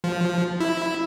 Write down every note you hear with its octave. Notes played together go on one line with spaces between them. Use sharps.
F3
E4